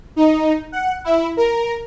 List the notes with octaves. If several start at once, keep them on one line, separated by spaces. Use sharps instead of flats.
D#4
F#5
E4
A#4